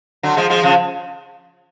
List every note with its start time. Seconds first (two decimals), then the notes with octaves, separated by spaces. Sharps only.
0.23 D3 F#3
0.37 F3 G#3
0.50 F3 G#3
0.63 C#3 F3